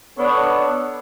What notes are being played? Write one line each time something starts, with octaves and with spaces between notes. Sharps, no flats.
B3 D4 A4 C#5